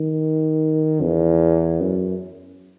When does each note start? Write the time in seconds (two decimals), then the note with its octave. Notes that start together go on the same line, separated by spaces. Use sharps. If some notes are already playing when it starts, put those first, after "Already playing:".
Already playing: D#3
1.03 E2
1.80 F#2